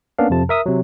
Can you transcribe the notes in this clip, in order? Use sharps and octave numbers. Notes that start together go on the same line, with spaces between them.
A#3 B3 C#4 D4 F5
F2 C3 F3 A5
A#4 E5 D#6
C3 F#3